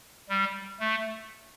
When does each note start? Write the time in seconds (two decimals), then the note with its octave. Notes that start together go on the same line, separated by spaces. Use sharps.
0.29 G3
0.80 A3